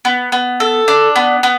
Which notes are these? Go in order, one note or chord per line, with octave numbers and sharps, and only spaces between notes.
B3
B3
A4
D4
B3
B3